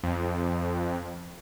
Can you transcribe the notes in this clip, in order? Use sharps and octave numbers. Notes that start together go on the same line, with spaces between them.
F2